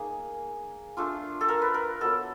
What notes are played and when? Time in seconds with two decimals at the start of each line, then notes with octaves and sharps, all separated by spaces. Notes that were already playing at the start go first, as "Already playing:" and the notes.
Already playing: A#3 D#4 G#4
0.97 A3 D4 F4
1.41 A4
1.49 A#4
1.62 B4
1.74 A#4
2.01 F#3 B3 E4 A4